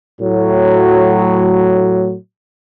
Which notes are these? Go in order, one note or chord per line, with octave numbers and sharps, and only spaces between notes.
A2 F#3